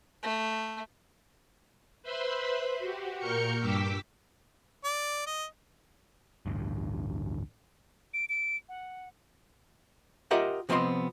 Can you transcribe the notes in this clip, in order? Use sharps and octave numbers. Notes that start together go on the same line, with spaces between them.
A3
B4 C5 E5 B5 C6
F#4 G4
A#2 A#4 C#6 F6 G6 C#7
G2 G5 D6 E6 B6
D5
D#5
A1 D2 G2
D7
D7
F#5
F4 G4 A#4 D#5 E5 F#5
C3 F3 B3 C4 D#5 C6